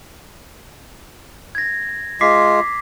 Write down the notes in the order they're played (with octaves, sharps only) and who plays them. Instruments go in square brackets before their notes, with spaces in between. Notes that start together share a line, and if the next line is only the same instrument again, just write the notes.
[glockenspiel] G#6 A#6
[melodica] G#3 F4 [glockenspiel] D6 B6 C7